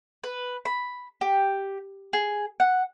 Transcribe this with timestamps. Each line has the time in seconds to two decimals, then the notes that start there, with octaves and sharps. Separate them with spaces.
0.24 B4
0.65 B5
1.21 G4
2.13 G#4
2.60 F#5